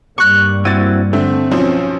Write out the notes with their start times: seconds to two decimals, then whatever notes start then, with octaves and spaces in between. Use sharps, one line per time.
0.18 G2 G3 A#3 C#6 F#6
0.65 C4 E4 F#4 A6 D#7
1.13 D3 A3 C4
1.51 B1 F3 C#4 C5